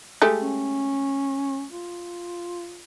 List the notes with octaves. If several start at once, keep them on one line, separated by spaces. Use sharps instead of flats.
G#3 A3 G4
C#4
F4